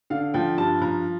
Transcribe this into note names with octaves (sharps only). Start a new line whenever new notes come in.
D3 F5
F3 G5
G2 A5
F3 A#5